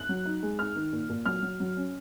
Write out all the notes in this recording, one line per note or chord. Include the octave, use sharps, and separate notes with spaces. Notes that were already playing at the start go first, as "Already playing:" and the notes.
Already playing: F#6
F#3
D#4
G#3
D#4 F6
D#3
A#2
A#2
F#3 F6
F#3
F#3
C#4